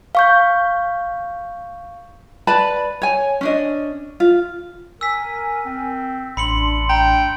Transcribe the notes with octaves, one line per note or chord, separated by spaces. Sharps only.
F5 C#6 G6
B4 D5 A5 B5
C#5 G#5
C#4 D4 D#5
F4
A#4 G#5 E6 B6
C4
A1 D4 B5 C6 C#7 F#7
G5 A#5